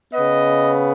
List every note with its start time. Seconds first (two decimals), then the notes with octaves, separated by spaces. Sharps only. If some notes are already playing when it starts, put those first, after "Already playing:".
0.14 C#3 B3 D#5